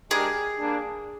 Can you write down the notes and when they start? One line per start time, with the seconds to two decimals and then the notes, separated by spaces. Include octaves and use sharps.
0.10 G#3 D4 G4 G#4 A#4
0.59 G3 A#3 D4